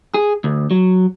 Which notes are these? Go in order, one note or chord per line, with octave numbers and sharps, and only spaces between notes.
G#4
D2
F#3